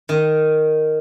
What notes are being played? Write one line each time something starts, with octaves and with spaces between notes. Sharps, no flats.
D#3